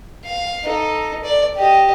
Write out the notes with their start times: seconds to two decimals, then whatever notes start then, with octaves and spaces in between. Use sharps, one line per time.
0.25 F5
0.64 D#4 A4
1.24 D5
1.56 G4 D#5